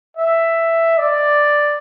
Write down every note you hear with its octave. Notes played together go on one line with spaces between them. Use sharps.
E5
D5